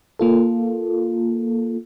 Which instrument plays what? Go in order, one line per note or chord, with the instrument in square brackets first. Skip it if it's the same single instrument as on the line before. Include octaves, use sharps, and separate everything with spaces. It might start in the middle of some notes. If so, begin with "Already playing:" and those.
[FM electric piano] A#3 F4 A4